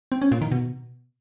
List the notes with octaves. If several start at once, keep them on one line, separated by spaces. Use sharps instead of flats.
C4
C#4
A#2
D#3
B2